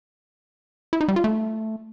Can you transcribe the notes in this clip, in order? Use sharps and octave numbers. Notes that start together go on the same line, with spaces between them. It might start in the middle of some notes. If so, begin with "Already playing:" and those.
E4
D#4
G3
F4
A3